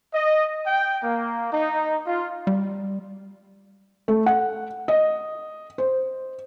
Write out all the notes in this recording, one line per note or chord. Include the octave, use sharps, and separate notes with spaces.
D#5
G5
A#3
D#4
F4
G3
A3
F#5
D#5
C5